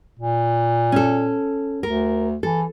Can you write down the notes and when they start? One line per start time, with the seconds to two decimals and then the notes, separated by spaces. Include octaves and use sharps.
0.19 A#2
0.92 C#4 A4
1.83 D2 A#4
2.43 E3 A4